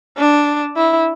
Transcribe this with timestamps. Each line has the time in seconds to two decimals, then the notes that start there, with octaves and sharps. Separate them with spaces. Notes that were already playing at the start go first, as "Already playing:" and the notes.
0.18 D4
0.77 E4